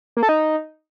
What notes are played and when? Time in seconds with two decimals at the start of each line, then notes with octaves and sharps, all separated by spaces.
0.17 A#3
0.23 A4
0.29 D#4